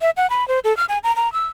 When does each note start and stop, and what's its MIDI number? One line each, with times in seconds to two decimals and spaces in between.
0.01 0.10 76
0.17 0.29 78
0.30 0.47 83
0.48 0.59 72
0.64 0.76 69
0.77 0.85 89
0.89 0.98 80
1.04 1.14 82
1.16 1.32 82
1.33 1.46 88